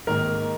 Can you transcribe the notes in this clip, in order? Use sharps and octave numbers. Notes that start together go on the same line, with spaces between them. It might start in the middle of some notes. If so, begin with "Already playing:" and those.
G#2 D#3 A#3 A#4